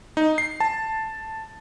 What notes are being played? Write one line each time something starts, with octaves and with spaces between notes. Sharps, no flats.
D#4
C7
A5